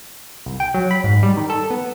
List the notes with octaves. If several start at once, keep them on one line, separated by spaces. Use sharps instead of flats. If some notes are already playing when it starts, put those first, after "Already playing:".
C2
G5
F#3
B5
G#2
G3
D#3
A4
B3